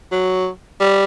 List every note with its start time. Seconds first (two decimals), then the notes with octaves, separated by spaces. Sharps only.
0.12 F#3
0.81 G3